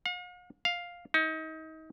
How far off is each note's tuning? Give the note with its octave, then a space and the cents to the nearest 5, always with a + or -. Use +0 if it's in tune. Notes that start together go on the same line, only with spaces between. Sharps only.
F5 +45
F5 +5
D#4 +30